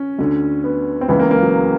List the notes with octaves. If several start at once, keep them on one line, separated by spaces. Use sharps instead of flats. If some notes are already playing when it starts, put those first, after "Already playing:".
Already playing: C#4
D2 D3
B3
C4
C#2 C#3 E3 B3
A#3
A#3
F#3